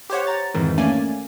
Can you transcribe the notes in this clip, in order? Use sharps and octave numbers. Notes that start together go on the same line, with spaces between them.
G4 C5 C#5 F#5
A#5 A6
F2 G#2 D#3 E3
A3 A#3 C#4 D5 G#5